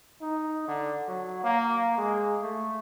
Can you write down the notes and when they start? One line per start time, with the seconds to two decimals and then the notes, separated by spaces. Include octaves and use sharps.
0.21 D#4
0.68 D3
1.08 F#3
1.44 A#3
1.98 G#3
2.42 A3